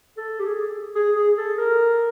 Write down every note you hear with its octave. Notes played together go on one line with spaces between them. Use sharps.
A4
G4
G#4
G#4
G#4
A4
A#4